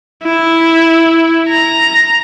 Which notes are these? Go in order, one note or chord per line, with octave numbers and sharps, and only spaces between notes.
E4
A#5